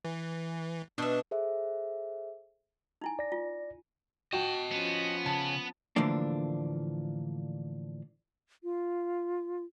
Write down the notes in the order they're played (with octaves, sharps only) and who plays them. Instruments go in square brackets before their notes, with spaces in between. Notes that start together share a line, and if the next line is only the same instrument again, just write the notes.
[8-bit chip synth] E3
[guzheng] B2 E5 [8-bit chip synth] D4
[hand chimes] G#4 A4 C5 E5
[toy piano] D#4 E4 G#5
[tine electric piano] D5 A#6
[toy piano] F4
[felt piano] F#4 G5 [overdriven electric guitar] D#5 A5
[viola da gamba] F3 C#4 [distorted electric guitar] B3
[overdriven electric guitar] C#3 [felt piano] A5
[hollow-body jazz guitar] A2 D3 E3 F3 A#3 D4
[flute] F4